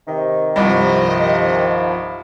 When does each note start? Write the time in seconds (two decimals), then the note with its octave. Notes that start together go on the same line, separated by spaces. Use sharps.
0.07 C3 D#3
0.56 C2 G2 F3 D#5